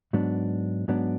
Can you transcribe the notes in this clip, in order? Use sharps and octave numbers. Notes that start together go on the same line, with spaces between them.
G#2 F#3 B3 D4
G#2 F#3 B3 D4